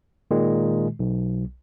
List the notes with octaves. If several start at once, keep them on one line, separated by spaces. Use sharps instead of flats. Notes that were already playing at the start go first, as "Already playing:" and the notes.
A#2 D#3 G#3
B1